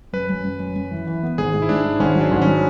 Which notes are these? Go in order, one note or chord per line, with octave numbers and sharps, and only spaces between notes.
F#2 B4
F#2
F#2
F#2
F#2
E3
E3
B3
G#1 G#4
G#2
E4
G#2 D4
G#2
G#1 C#4
F#3
D4
G#1
C#4
F#3